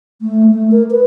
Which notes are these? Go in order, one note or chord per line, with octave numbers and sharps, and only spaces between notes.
A3
A3
A#4
B4